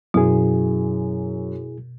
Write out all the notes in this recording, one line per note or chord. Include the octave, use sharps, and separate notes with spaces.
F#2 B2 E4 G#4